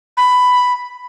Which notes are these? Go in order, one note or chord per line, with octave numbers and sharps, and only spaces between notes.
B5